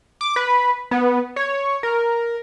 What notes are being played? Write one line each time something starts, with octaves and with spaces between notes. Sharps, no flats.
D6
B4
B3
C#5
A#4